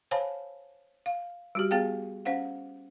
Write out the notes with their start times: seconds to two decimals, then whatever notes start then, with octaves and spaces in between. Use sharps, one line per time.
0.11 C5 C#5 F5 G#5 A5 B5
1.06 F5
1.55 G3 F#4 G4
1.71 B3 G#4 F5 G5
2.25 C#4 C5 F5 F#5